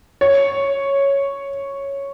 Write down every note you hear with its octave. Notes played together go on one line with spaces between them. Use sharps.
C#5